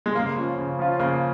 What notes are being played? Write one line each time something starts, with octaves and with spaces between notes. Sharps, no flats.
G#3
C#3 A#3
F3 C#4 F4
C#3
F3 C#4 F4
C#3 A#3